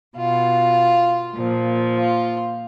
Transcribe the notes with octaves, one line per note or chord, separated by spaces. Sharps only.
B2 F4
A#2 F3
F4